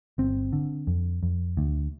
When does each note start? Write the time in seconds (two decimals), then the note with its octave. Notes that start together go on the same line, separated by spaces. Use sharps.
0.18 G1 C4
0.53 D3
0.87 F2
1.23 F2
1.57 D2